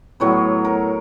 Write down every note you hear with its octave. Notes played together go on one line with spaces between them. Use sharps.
A2 F#3 B3 C#5
A#4